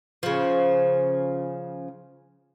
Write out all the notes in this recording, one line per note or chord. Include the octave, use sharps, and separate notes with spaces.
C#3 F3